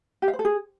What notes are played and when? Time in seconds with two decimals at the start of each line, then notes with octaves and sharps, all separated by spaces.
0.22 G4
0.28 F5
0.33 C5
0.39 A4
0.45 G#4